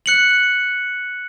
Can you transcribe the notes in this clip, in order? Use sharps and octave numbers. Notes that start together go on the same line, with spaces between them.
F#6 C#7 F#7